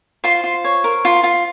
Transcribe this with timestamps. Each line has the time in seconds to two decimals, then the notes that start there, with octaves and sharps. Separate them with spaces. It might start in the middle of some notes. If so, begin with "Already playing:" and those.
0.24 F4 C5 C6
0.44 F4
0.64 C#5
0.84 A#4
1.05 F4
1.24 F4